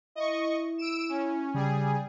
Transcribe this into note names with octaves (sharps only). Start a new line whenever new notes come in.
E4 D#5 C#6
E6 D7 E7
C#4
C#3 G3 G#4